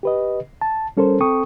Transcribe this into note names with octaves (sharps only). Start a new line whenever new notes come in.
G4 B4 D#5
A5
G3 C#4 A4 A#4 C5
C4 A4 G5 C#6 D#6